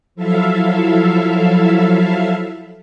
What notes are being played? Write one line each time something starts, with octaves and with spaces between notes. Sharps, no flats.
F3 F#3 E4 A4 E5 F5